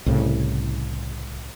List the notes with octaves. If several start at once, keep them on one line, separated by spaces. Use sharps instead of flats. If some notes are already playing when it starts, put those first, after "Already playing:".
C2 A2 C#3